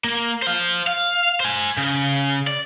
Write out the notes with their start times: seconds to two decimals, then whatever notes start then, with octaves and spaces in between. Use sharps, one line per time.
0.04 A#3
0.42 C5 F5
0.87 F5
1.40 C5 G#5
1.78 C#3
2.47 D5